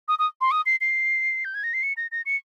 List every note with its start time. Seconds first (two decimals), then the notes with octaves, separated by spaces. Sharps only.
0.08 D#6
0.19 D#6
0.41 C6
0.51 D#6
0.66 C7
0.81 C7
1.45 G6
1.55 G#6
1.64 A#6
1.74 C7
1.83 C#7
1.97 A#6
2.12 A#6
2.26 C#7